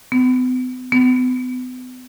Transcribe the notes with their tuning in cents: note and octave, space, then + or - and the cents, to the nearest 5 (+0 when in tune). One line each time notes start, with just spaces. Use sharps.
B3 +45
B3 +40